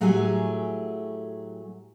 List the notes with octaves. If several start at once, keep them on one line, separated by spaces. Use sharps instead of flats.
A2 F#3 A3 G4 G#4 G#5